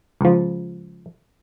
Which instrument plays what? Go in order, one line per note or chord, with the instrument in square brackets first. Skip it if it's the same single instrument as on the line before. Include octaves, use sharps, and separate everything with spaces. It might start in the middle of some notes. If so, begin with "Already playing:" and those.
[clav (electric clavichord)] C#2 F3